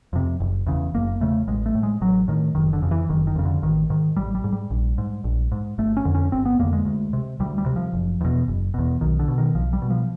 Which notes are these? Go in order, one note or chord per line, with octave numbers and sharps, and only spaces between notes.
F2 C3
F#1
E2 C#3
F#1 A#3
E2 C#3 A3
A1 G#3
A3
A2
G#3
A1 F#3
A2 D#3
F#1 D#3
D3
F2 C#3
E3
F#1 D#3
D#3
F2 C#3
D3
A1 D#3
G#2 D#3
A1 G3
G3
G#2
G3
A#1
G#2
A#1
G#2
G1 A3
C#4
F2 D3
C#4
G1 C4
B3
F2 D3 A#3
G#3
D2
C3
D2 G3
G3
C3
F3
F#1
E2 B2
F#1
E2 B2
B1 D#3
D3
B2
D#3
B1 F3
G3
B2
F3